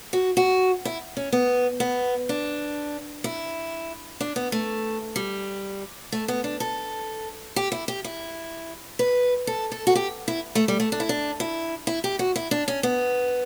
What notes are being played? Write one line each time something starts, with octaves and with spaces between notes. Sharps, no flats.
F#4
F#4
E4
C#4
B3
B3
D4
E4
D4
B3
A3
G3
A3
B3
D4
A4
G4
E4
G4
E4
B4
A4
A4
F#4
G4
E4
A3
G3
A3
D4
E4
D4
E4
E4
G4
F#4
E4
D4
C#4
B3